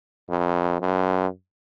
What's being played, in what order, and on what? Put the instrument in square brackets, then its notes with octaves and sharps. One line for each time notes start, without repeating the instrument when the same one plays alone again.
[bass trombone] F2
F#2